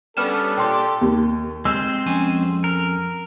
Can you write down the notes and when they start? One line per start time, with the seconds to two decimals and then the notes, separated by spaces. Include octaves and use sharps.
0.17 G3 B3 C#4 D4 A4 B4 F6 E7
0.57 A#2 G4 G5 C6
1.01 D#2
1.65 G#3 C4 C5 E6
2.06 F2 C#4 G#5
2.64 A#4